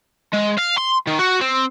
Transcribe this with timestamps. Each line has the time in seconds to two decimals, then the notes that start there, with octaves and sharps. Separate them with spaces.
0.34 G#3
0.59 F5
0.78 C6
1.07 D#3
1.19 F#4
1.41 C4